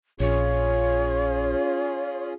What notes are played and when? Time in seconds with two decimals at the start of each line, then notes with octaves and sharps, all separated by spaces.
0.20 A#1 C#4 F4 G#4 C#5